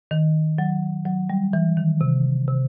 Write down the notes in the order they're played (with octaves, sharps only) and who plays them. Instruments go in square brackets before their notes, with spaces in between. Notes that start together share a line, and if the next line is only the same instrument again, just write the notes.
[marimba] D#3
F#3
F#3
G3
E3
D#3
C3
C3